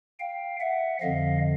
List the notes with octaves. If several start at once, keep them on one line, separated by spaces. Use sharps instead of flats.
F5 G5
E5 F#5
F2 D3 F3 D#5 F5